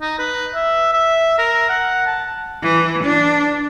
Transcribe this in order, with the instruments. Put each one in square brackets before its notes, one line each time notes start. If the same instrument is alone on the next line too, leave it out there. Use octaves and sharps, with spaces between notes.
[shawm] D#4
B4
E5
E5
A#4
F#5
A5
[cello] E3
D4